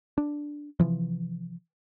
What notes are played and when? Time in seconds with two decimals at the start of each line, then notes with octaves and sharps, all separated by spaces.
0.18 D4
0.80 C3 E3 F3